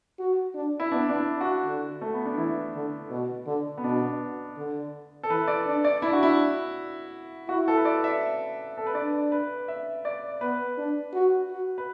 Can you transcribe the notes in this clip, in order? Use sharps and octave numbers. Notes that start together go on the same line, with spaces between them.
F#4
D4
E4
B3 D4
D4
E4
F#4
D3
A3
B3
D4
E3 E4
D3
B2
D3
B3
B2 D4
D3
A4
E3 B4
D5
D4
D5
D4 E4
F#4
E4
E4 F#4
A4
B4
D5
E5
A4
B4
D4 D5
B4
E5
D5
B3 B4
D4
F#4
F#4
B4